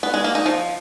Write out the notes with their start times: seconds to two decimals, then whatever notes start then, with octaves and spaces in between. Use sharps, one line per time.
0.03 B3
0.14 G#3
0.24 A#3
0.35 D#4
0.46 F3